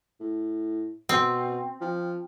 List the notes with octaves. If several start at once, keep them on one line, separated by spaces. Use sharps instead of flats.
A2
B2 C4
F3